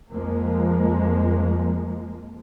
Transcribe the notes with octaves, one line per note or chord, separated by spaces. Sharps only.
F2 F3 G#3 A#3